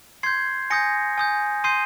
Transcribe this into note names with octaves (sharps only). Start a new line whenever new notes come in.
C6 G6 G#6 C7
G#5 D#6 G6 A#6 C#7
G#5 D#6 G6
C6 D#6 G6 C7 D#7